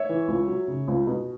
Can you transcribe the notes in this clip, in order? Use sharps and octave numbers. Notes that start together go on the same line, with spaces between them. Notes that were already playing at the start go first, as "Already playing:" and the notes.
Already playing: C#5 E5
E3
C#2
F#3
C#3
C#2
B2